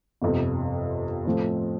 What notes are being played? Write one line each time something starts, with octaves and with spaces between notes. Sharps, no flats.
G1 F2 C3
A2 F3 C4